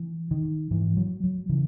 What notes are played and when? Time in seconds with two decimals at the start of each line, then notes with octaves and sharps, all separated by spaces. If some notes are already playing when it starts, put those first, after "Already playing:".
Already playing: E3
0.31 D#3
0.71 G#2 E3
0.97 F#3
1.24 F#3
1.49 C#3 E3